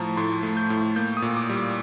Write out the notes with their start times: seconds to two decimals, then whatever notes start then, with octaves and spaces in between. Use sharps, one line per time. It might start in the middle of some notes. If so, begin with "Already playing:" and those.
Already playing: A2 F3 A3 A5 A#5
0.17 A2 C6
0.43 A3
0.57 G6
0.70 A2
0.96 A#3 G6
1.17 D#6
1.22 A#2
1.37 D6
1.50 G3
1.56 D6